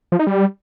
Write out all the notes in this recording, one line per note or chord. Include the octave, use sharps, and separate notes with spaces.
F3
D#4
G3